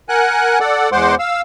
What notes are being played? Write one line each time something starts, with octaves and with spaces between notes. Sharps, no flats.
A#4 F#5 G#5 F#6
A4 D5 F#5
E2 G#3 C5 F#5 C6 D6
F5 E6